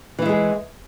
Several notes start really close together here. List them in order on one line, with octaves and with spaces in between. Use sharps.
E3 E4 G#3 G#4